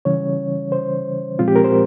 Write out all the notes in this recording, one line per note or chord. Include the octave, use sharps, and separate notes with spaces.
C#3 E3 G3 C#4 C#5
C5
A#2 F3 G#3 C4 F4
G4
A#4
C5